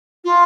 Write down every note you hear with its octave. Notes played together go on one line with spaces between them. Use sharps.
F4